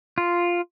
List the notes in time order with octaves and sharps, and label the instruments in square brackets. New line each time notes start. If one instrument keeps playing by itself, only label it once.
[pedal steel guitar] F4